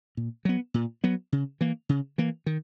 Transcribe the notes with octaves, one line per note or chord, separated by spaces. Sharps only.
A#2
F#3 B3
A#2
F#3 B3
C#3
E3 A#3
C#3
E3 A#3
D#3